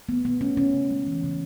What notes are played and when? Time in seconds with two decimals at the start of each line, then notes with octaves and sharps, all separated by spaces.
0.09 A3 B3
0.24 B2 B3
0.41 A3 C#4
0.57 C#3 C#4
0.74 C#3
0.91 G#3
1.07 E3
1.23 C#3